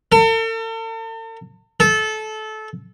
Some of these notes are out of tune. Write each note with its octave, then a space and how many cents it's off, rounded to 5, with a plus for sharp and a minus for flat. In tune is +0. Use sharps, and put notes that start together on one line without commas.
A4 +45
A4 -20